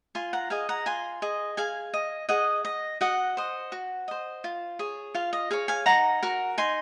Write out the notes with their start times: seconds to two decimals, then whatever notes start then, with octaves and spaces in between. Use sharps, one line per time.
0.15 F4 G#5 C6
0.33 F#5 A#5
0.50 G#4 D#5 F5 G#5
0.69 F#5 A#5
0.86 F4 G#5 C6
1.22 G#4 D#5
1.57 G#4 F5 G#5
1.94 D#5
2.29 G#4 D#5 F#5
2.65 D#5
3.01 F#4 D#5 F#5
3.37 C5 D#5
3.72 F#4
4.08 C5 D#5
4.44 F4
4.79 G#4 C#5
5.15 F4 F5
5.33 D#5
5.51 G#4 C#5 F5
5.68 F5 G#5
5.86 D#4 F#5 A#5
6.23 F#4 A#4
6.58 D#4 G#5 C6